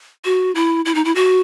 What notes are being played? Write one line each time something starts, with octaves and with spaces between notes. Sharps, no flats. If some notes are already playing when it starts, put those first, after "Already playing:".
F#4
E4
E4
D#4
E4
F#4